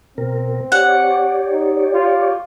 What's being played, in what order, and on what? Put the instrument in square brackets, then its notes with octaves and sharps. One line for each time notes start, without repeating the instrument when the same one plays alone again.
[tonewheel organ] B2 A#4 [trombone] C4
[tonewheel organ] G4 C#5 D5 [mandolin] F#5
[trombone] D#4
F4